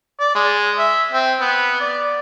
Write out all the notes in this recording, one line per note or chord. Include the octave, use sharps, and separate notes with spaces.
D5
G#3
E5
C4
B3
D5